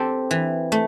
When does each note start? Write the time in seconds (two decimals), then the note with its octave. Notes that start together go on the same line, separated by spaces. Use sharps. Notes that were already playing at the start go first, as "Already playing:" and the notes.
Already playing: C4 G4 A4
0.31 E3
0.72 A3